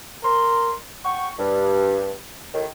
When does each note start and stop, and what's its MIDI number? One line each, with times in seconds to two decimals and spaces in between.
0.23 0.74 70
0.23 0.74 84
1.05 1.28 78
1.05 1.28 79
1.05 1.28 85
1.38 2.14 43
2.54 2.66 39
2.54 2.66 45
2.54 2.66 51